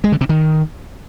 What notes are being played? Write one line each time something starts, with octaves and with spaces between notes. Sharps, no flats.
G#3
D3
C3
D#3